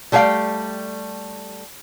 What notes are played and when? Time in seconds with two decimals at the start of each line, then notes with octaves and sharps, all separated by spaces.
0.12 G3 A3 G#4 C#5 F5 G5